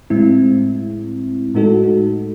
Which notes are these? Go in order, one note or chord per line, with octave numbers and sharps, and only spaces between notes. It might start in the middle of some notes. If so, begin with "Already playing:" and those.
A2 G#3 C4 E4
A2 G#3 D#4 F#4 A4